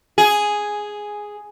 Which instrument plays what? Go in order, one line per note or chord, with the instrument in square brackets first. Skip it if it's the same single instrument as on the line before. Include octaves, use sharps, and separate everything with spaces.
[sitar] G#4